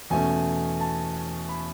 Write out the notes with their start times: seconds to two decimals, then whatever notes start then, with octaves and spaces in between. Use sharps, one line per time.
0.10 E2 B2 A3 C#4 G#5
0.80 A5
1.49 B5